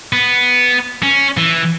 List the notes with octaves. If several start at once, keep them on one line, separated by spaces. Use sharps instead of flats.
B3
C#4
E3